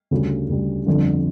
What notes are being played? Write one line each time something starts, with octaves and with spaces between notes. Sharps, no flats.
D2 C#3 G3
D2 C#3 G3
G1 F2 D3